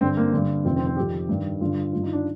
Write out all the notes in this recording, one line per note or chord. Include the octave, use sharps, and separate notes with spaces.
G2 D3 C4
A#3
G2 D3
F2 C3 D#3 C4
C4
C4
F2 D#3 G4
G2 D#3
G2 D3 F4
G2 D#3 F4
D#4
D4